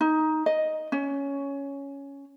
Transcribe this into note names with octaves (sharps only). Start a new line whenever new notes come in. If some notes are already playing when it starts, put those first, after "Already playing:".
D#4
D#5
C#4